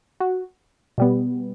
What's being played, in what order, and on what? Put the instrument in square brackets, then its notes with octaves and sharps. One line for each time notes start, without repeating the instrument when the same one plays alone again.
[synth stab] F#4
B2 G3 B3